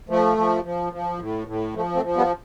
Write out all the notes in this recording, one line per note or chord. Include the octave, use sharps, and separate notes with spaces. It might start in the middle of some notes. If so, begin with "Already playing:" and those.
F3 A3
F3
F3
F3
A2
A2
F3 A3
A3 C4
F3
G3 B3